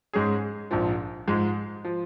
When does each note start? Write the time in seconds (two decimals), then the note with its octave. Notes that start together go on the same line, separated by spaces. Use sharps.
0.13 G#2 G#3 C#4 G#4
0.71 A#1 G#2 F3
1.27 G#2 F3 G#3
1.84 F3